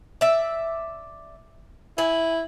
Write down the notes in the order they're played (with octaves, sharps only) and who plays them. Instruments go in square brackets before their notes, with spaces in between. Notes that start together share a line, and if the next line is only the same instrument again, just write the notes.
[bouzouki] D5 E5
[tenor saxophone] E4 [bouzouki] G#5